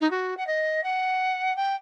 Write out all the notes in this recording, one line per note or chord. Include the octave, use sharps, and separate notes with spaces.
D#4
F#4
F#5
D#5
F#5
G5